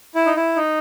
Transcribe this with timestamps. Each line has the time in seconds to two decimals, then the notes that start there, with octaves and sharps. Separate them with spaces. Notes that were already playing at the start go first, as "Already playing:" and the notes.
0.15 E4
0.26 D#4
0.36 E4
0.56 D#4